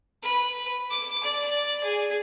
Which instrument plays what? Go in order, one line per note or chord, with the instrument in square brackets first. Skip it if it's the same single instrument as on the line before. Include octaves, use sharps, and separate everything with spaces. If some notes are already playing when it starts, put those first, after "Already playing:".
[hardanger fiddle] B4
D6
D5
G#4